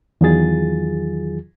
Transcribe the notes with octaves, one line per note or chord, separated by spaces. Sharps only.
E2 D#3 F#3 F4 G#4 A6